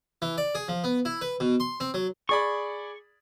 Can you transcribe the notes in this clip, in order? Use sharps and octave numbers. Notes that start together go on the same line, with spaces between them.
E3
D5
G#4
F3
B3
E4
B4
B2
C6
C4
F#3
G#4 D5 B5 C#6